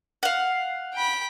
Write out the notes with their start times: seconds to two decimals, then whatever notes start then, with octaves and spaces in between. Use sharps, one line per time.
0.23 F5 F#5
0.94 G5 B5